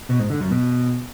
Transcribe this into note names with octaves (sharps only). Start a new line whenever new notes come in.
B2
G#2
D3
F#2
B2